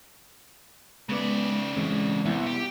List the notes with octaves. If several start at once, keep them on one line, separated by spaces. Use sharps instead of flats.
C#3 G#3 B3 B4 D5
E3 G#3 C4
C2 B3 E4
G4